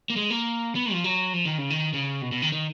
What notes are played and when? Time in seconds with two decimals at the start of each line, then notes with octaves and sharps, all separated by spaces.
0.10 A#3
0.16 G#3
0.30 A#3
0.75 B3
0.92 F3
1.04 F#3
1.33 F3
1.45 D#3
1.58 C#3
1.70 D#3
1.93 C#3
2.22 B2
2.32 B2
2.42 D#3
2.52 D#3